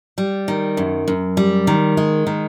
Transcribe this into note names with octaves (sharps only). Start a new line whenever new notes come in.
G3
D#3
F#2
F#2
G3
D#3
G#3
D#3